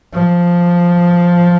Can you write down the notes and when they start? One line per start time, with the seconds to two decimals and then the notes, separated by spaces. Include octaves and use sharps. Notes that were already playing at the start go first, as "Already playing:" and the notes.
0.13 F3